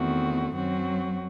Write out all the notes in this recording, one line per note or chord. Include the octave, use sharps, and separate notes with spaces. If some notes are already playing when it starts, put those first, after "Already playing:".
Already playing: E2 D#3 A3 C4 F#4
F#2 F#3 C4 F#4